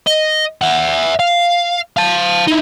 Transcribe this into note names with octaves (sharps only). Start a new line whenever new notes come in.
D#5
E5 F#5
F5
F5 A5
D#4 E4